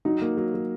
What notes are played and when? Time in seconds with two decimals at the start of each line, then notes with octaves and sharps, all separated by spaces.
0.05 F#3 D#4
0.22 A#3
0.37 F#3
0.54 F#3